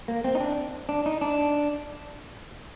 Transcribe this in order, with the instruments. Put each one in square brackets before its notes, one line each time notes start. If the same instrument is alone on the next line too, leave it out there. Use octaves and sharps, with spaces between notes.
[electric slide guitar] A#3
C4
D#4
D4
D4
D#4
D4